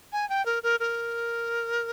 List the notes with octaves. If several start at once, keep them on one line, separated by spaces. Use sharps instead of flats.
G#5
G5
A#4
A#4
A#4